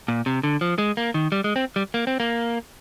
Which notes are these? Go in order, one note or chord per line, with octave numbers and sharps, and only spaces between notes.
A#2
C3
D3
F3
G#3
A#3
D#3
G3
G#3
C4
G3
A#3
C4
A#3